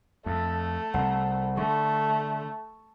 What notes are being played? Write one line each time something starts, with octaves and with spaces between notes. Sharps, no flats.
F2 A3
C2 F#5
D3 A3 C#6